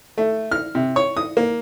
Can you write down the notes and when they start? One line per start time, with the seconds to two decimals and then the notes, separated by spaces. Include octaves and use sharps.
0.18 A3
0.52 F6
0.75 C3
0.96 C#5
1.17 D#6
1.37 A#3